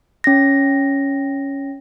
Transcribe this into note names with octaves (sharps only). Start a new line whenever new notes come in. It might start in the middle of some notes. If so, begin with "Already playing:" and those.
C#4 A#6